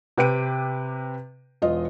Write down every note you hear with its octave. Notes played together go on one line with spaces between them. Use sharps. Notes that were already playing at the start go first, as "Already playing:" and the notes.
C3 B4 G5 D6 D7 D#7
E1 F4 D#5